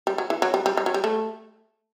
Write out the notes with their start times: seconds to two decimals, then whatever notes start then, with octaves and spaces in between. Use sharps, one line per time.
0.07 G3
0.18 F#3
0.30 E3
0.42 F#3
0.54 G3
0.66 G3
0.77 G3
0.86 F#3
0.94 G3
1.04 A3